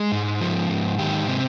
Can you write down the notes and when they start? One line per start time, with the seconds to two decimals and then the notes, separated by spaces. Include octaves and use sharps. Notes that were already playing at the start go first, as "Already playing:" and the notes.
Already playing: G#3
0.12 G#2
0.41 F3
0.69 G#2
0.98 D#3 G4
1.27 C3